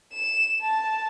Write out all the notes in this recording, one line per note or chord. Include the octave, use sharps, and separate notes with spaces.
E7
A5